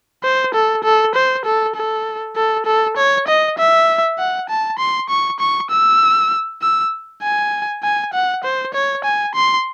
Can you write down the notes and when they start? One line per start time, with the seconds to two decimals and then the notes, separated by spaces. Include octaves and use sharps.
0.24 C5
0.54 A4
0.84 A4
1.15 C5
1.45 A4
1.76 A4
2.36 A4
2.66 A4
2.97 C#5
3.28 D#5
3.58 E5
4.18 F#5
4.49 A5
4.78 C6
5.09 C#6
5.39 C#6
5.70 E6
6.62 E6
7.22 G#5
7.83 G#5
8.13 F#5
8.44 C5
8.74 C#5
9.04 G#5
9.35 C6